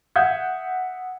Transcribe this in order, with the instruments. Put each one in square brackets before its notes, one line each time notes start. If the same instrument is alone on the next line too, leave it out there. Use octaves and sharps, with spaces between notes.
[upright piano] E5 F#5 D#6 G6 G#6